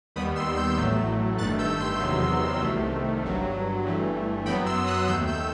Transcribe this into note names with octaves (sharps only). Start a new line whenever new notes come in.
D#2 D#3 G3 B3 B5 D#6
C6 E6
E6 G6
A1 A2 F#3 A3
G1 G2 D#3 A3 F#6 A6
E6 G6
C6 E6
E2 C3 D#3 F#3 B3
C2 C3 D#3 A3
G1 G2 F#3
G1 G2 E3 A3
F#2 F#3 B3 G5 B5
C6 E6
D#6 F#6
D#2 D#3 A3 E6 G6
E6 G6